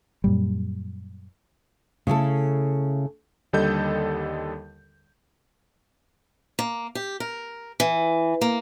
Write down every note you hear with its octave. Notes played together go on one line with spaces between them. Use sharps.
F#2 A#2 G3
C#3 A3 E4 A4
D#2 D3 G3 A4 D#5 G6
A#3
G4
A#4
E3
A#3